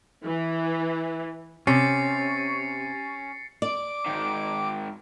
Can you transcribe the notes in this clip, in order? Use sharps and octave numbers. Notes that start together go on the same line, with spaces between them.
E3
C3 C#4 A6 C7 C#7
D5 D6
G#2 D#3